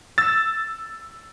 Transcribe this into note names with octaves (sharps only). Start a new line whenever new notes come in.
E6 A6